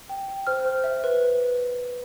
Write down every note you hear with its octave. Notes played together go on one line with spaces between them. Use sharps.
G5
G5
C5 F6
C5
E5
B4